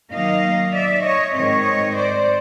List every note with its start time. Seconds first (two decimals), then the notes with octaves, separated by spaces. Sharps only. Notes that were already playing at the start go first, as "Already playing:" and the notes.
0.12 D#3 F#3 A#3 D#4 D#5 F5
0.74 D5 E5
1.04 C#5 D#5
1.35 G#2 D#3 G#3 C4 C#5 D#5
1.98 C5 D5